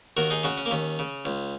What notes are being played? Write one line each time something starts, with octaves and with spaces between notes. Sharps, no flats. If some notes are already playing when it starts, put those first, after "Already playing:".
D#2 F#4 A#4
D#4 G#4
C#3 C#4 F#4
C#4
A#3
D#2 C#4
C#3
C#2